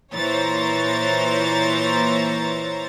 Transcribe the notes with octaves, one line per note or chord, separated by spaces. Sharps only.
A#2 E3 C5 C#5 A#5 A6